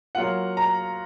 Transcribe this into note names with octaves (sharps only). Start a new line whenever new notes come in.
F#3 A#3 F4 F#5
A#5